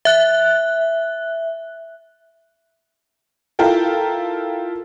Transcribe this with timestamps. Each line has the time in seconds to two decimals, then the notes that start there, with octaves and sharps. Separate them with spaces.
0.05 E5 F#6
3.59 E4 F4 A4 A#4 G5